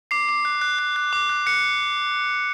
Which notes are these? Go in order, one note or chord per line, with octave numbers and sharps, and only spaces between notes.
D6 C7
D6
F#6
F#6
F#6
F#6
D6
F#6
F#6 C#7